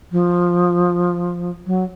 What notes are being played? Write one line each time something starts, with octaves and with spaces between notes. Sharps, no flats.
F3
F#3